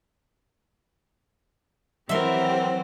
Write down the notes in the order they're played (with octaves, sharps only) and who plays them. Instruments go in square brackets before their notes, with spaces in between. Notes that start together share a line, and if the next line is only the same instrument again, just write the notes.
[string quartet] E3 C4 [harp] F#3 [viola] G4 A#4 [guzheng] E5 C6